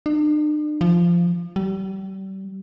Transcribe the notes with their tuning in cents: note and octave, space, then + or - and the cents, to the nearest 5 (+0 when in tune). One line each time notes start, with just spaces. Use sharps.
D4 +45
F3 -15
G3 -35